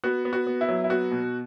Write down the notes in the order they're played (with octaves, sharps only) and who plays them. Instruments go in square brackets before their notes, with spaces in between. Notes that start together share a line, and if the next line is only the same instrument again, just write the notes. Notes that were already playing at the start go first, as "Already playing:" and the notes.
[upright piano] B3 F#4
B3
F#4
B3
E4
F#3
E4
B3 F#4
B2